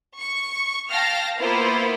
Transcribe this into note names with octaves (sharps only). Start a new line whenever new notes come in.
C#6
F5 G5 A5 F6 A#6
A#3 B3 E4 F4 C5